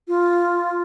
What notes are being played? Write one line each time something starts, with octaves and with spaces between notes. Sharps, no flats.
F4